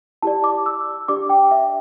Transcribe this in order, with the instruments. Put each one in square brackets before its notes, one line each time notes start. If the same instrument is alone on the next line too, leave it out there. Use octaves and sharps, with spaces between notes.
[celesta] E4 G4 D5 A5
D6
E6
D4 G4 D5 D6
G5
E5